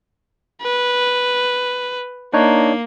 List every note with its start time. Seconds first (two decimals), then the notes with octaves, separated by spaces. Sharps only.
0.62 B4
2.33 A#3 D4 D#4 C#5